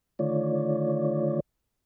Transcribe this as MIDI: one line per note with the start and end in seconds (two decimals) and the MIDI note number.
0.19 1.40 50
0.19 1.40 51
0.19 1.40 57
0.19 1.40 65
0.19 1.40 73
0.19 1.40 74